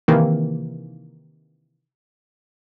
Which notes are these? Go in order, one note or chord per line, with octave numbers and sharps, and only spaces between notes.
C3 D#3 E3 A#3